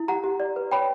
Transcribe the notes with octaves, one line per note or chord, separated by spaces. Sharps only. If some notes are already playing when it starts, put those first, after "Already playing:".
Already playing: E4
G4 F#5 A#5
G4
D5
B4
C#5 G5 B5